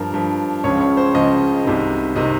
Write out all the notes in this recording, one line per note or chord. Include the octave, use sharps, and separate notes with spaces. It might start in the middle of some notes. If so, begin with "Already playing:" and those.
Already playing: G2 F3 A#4
G2 F3
C#2 C#3 F3 C#5
C#5
C5
C#2 C#3 F3 D#5
C2 C3 D#3
C3 D#3 D#5